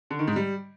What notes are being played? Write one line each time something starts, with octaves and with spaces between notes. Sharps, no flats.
D3
D#3
G#2
G3